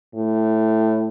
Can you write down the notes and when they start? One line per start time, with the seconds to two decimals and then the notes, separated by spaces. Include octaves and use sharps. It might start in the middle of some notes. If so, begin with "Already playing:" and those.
0.15 A2